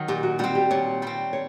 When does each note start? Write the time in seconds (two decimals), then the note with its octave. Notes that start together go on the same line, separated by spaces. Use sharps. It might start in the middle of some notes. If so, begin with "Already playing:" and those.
Already playing: D#3 F#3
0.08 A#2 G4
0.23 F#4
0.39 G3 C4 F#4
0.55 G4
0.71 A#2 C#5
1.02 G3 C4
1.33 C#5